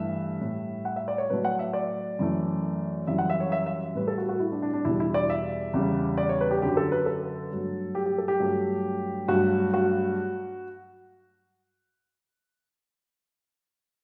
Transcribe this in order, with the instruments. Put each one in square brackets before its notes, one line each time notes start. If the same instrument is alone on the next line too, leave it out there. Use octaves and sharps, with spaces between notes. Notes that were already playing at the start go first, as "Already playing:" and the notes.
Already playing: [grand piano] G2 E3 A3 E5
A2 G3
F#5
E5
D5
C#5
A2 F#3 A3 B4
F#5
E5
D5
F#2 E3 A3
F#2 E3 G3 E5
F#5
E5
C#5
E5
E5
A2 G3 B4
A4
F#4
F#4
E4
D4
D4
D4
E2 B2 G3 E4
E4
D5
E5
E2 C#3 G3
D5
C#5
B4
G4
F#2 D3 F#3 G4
A4
B4
A4
G2 F#3 A3
G4
G4
A4
G4
G2 F#3 A3
G2 F#3 A3 F#4
F#4